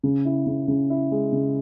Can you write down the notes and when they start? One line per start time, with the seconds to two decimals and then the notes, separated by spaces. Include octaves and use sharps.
0.03 C#3
0.25 E4
0.47 C#3
0.68 C#3
0.90 E4
1.11 G#3
1.32 C#3